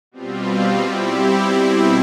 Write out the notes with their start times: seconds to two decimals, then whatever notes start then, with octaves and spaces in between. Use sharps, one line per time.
0.11 B2 G3 C4 F4
0.78 G3 C4 E4 G4
1.45 B2 G3 C4 E4